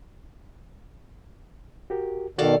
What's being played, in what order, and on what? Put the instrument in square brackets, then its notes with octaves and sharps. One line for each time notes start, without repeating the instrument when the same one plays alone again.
[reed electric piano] F#4 G4 A#4
[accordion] B2 D#3 [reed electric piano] F#4 [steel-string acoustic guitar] A4 D5 F5